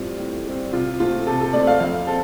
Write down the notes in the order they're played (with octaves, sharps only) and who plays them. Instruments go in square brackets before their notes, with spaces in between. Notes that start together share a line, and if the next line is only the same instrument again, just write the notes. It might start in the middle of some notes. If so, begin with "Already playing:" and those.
Already playing: [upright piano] A2 G3 C4 F4
A2
G3 C4
C3 F4
A3 C4 F4
C3 A4
A4
A3 C4 D5
F5
F2 F5
C4 A4